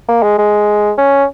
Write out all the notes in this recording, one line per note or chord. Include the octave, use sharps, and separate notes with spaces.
A#3
G#3
G#3
C#4